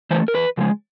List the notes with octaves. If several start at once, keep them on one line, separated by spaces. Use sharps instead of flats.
E3 A3 C5
A#4
E2 B4
C#3 F3 G#3